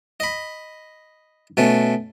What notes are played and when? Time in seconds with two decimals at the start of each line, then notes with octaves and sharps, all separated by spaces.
0.20 D#5 B5
1.57 B2 A3 C#4